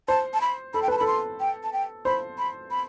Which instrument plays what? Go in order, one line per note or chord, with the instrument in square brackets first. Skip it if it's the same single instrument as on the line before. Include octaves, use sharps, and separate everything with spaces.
[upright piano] C5 [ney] A5
[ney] A5
B5
[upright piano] A4 [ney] B5
[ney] G5
[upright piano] B4 [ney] A5
[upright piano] A4 [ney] B5
[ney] C6
G5
A5
G5
[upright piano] C5 [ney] B5
[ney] B5
B5